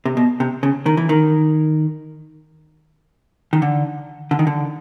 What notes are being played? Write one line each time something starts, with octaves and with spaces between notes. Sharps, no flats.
C3
B2
C3
C#3
D#3
E3
D#3
D#3
D3
D3
D#3
D3